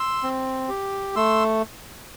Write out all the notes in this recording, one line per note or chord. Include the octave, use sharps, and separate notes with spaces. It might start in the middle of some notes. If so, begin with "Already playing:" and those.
Already playing: C6 E6
C4
G4
A3 C6 E6